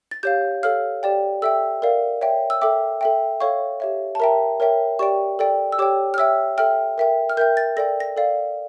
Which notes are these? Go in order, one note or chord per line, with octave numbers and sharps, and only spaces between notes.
A6
G4 C#5 F5 G6
A4 C#5 F5 F6
G4 D5 G5
A4 E5 G5 E6
A#4 D5 F5
C#5 E5 G5
E6
A4 E5 G5 D6
A4 E5 G5
A4 C#5 F5 C#6
G4 C#5 E5
A5
A#4 E5 G5 A#5
A#4 C#5 E5 G5
G4 D5 G5 C#6
A4 D5 G5
E6
G4 C#5 G5 D6
F6
C#5 E5 G5 E6
A4 E5 G5 F6
A#4 E5 G5
F6
A#4 E5 G5 G6
A6
A4 D5 G5 A#6
A#6
A4 D5 F5